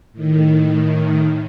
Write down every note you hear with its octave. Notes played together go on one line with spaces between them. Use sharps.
A2 D#3